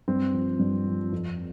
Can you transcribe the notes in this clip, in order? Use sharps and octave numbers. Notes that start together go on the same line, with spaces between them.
G2 C4
F3
G2
F3
F2